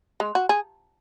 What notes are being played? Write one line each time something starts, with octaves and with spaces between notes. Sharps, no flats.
G#3
F#4
G#4